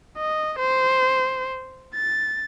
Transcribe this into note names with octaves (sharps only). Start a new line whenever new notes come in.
D#5
C5
A6